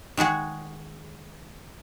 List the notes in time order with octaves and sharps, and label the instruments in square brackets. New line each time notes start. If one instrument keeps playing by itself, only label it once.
[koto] D#3 G#3 F#4 G#4